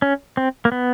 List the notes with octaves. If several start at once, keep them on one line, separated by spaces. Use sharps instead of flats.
C#4
C4
A#3
B3